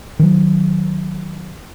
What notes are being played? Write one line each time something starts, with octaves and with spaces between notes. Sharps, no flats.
D#3 F#3